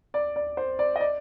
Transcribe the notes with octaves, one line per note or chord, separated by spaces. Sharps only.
D5
D5
C5
D5
D#5
D5